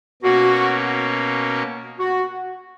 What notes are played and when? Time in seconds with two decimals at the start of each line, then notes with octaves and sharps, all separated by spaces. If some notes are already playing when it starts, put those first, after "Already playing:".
0.22 B2 A#3 C#4 F#4
1.98 F#4